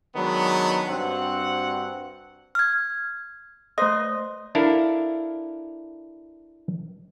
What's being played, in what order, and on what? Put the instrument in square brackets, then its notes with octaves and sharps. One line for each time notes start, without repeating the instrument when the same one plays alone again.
[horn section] D#3 F#3 G#3 B3 D4
G2 C4 F#4 F#5
[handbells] F6 G#6
[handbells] A3 D#6 [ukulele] B4 C5 D#5
[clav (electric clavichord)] D4 E4 A4 A#4 F5